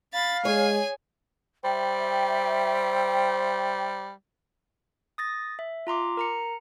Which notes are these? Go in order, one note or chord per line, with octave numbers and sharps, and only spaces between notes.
F5 B5 A6
G#3 G#4 C#5 G#5
G3 C5 E5 G5
D#6 A6 A#6
E5
F4 A#5 C6 D6
A#4 A#5 C#7